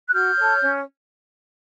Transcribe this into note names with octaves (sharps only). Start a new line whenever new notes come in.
F#6
F#4 F6 G6
A4 C#5
C#4